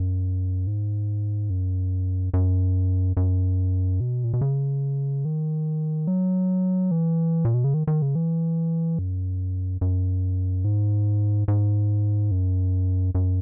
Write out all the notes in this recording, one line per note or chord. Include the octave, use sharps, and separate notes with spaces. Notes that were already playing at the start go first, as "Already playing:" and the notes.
Already playing: F#2
G#2
F#2
F#2
F#2
B2
A#2
B2
C#3
D#3
F#3
E3
A#2
B2
C#3
D#3
D#3
C#3
E3
F#2
F#2
G#2
G#2
F#2
F#2